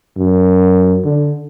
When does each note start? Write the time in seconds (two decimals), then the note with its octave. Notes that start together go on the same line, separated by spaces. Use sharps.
0.17 F#2
1.04 D3